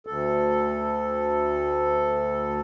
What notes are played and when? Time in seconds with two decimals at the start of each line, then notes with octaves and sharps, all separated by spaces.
0.07 D2 A4